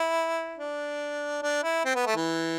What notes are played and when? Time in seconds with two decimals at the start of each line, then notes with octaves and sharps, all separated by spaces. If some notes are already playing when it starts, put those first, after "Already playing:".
Already playing: E4
0.58 D4
1.43 D4
1.63 E4
1.85 C4
1.95 B3
2.07 A3
2.16 E3